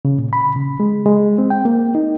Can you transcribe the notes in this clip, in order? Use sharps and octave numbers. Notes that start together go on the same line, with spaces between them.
C#3
A#2
B5
C#3
G#3
G#3
C4
G5
A#3
D#4